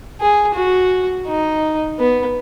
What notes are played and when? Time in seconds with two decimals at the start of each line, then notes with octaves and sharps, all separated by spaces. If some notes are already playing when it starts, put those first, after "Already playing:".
0.21 G#4
0.55 F#4
1.27 D#4
1.99 B3